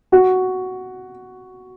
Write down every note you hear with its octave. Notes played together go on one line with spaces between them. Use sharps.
F#4